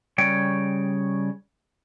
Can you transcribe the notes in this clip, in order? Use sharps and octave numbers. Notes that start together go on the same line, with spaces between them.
C#3 G3 C#5 G5